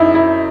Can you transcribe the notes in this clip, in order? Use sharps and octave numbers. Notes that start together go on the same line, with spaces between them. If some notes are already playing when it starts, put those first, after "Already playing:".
Already playing: F#2 D#4 E4
E4